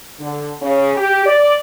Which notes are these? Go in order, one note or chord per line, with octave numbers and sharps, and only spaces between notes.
D3
C#3
G4
D5